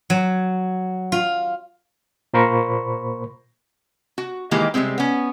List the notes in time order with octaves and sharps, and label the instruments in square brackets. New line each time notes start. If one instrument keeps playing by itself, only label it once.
[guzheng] F#3
F4
[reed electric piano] A#2 A#3 A#4 C5 B5 C#6
[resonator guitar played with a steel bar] F#4
D#3 E3 G#3 A#3 G4 A#5
C3 F3 G3 G#3 C4
B3 C#4